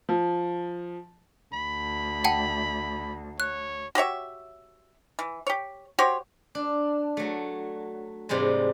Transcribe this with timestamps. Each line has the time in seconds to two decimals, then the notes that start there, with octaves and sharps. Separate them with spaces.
0.09 F3
1.54 D2 B5
2.24 F#5 G5 A5
3.40 C#5 F#6
3.95 F#4 G4 C#5 E5
5.19 E3
5.47 G4 C#5
5.99 F#4 G4 C5 C#5
6.55 D4
7.17 F#3 A3
8.29 G#2 C3 E3 G3 G#3